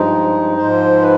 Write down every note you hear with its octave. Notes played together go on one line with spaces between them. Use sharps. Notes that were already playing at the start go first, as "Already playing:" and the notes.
Already playing: G2 F3 G#3 D#4
G#2 F3 G#3 C5
B4